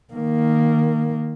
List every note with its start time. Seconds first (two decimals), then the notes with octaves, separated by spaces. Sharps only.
0.14 D#3 A#3